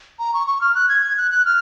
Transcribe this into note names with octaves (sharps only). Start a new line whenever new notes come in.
A#5
C#6
C#6
F6
F#6
G#6
G#6
F#6
F#6
F6